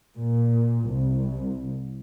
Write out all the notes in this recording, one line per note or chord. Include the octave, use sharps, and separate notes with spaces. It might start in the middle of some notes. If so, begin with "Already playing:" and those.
A#2
C2